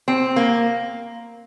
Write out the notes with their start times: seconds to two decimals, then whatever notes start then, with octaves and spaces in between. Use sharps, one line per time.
0.08 C4
0.36 A#3